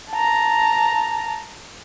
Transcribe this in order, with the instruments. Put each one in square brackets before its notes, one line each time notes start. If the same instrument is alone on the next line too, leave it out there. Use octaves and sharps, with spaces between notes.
[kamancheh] A5 A#5